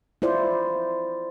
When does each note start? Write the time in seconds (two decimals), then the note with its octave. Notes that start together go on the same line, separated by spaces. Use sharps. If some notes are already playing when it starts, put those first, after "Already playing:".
0.22 E4 F4 C5 D5